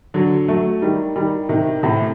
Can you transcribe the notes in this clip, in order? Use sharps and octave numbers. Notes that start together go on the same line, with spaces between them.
D3 F#3
F#3 A3
D#3 G3
D#3 G3
C3 D#3
A2 C3